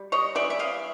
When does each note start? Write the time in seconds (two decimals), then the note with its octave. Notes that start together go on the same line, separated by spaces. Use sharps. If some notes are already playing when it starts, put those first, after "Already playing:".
Already playing: G3
0.12 C#5 D#5
0.35 E3 D5 E5
0.50 E5
0.59 D#5 F5